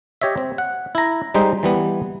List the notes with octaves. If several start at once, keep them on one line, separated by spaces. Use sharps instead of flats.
G4 C#5 D#5 E5
C4
F#5
E4 A#5
G3 G#3 D#4 C5
E3 G3 B3